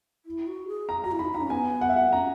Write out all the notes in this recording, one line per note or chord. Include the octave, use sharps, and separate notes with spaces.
E4
F#4
G#4
A#5
F#4 A#5
E4
D#4 B5
D#4 A#5
C#4
B3 G#5
F#5
E5
F#5
C#4 A#5